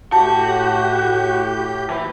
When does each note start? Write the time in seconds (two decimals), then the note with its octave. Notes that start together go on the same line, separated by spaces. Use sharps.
0.12 A2 F#4 G4 A5 G6
1.90 D#2 E3 B4